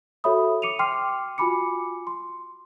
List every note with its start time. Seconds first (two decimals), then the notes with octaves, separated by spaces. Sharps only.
0.24 F#4 A4 C#5 E5 B5 D#6
0.62 D6 C#7 D#7 F7
0.79 G5 C6 D6 F6 C7
1.38 F4 F#4 G#5 B5 D6 C#7
2.07 C6